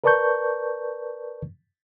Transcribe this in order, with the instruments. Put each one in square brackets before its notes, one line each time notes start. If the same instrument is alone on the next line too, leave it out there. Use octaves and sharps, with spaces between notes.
[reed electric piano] A#4 B4 D5 A5 C#6 G6